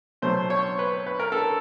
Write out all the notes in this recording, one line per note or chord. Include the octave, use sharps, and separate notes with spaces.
B2 F#3 A3 C5
C#5
B4
B4
A#4
A4